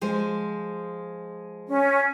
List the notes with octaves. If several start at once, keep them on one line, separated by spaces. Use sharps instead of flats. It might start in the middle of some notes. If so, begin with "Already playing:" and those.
F3 G#3 C5
C#4